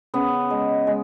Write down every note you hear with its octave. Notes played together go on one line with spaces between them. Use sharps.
C#3 B3
G#3
G#3